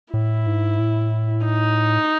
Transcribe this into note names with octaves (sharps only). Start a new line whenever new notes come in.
A2 E4
G#2
A2
D#4